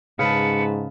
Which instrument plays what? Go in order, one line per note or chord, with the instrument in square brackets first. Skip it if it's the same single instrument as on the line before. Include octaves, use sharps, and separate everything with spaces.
[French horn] G#2 [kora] C#3 [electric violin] B4 A5 [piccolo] C#7